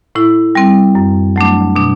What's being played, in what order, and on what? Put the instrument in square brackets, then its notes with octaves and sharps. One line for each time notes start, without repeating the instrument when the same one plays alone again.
[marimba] A2 E4
G3 C4
F#2
F#3 A3 D4
B2 D4